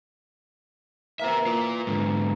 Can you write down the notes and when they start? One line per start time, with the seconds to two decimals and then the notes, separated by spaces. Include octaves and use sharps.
1.20 E3 A#3 C5 E5
1.46 F4 A#4
1.87 G#2 D3